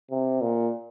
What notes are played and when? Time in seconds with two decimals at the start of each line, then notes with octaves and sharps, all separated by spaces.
0.11 C3
0.41 A#2